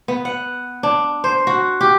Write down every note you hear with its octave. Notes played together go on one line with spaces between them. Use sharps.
B3
F#5
D4
C5
F#4
G4